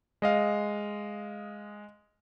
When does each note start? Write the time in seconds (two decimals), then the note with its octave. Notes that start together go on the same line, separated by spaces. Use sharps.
0.22 G#3 D#5 F5